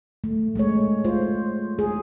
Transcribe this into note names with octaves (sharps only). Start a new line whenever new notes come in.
A3
G#3 A3 C#5
F4 C5
G#4